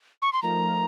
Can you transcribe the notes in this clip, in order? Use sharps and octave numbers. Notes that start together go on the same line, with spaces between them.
C#6
C6
F3 A3 D#4 A#4 A#5